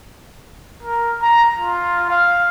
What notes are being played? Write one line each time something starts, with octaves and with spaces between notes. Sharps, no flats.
A#4
A#5
F4
F5